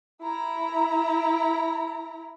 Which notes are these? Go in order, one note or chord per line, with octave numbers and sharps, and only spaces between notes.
E4 A#5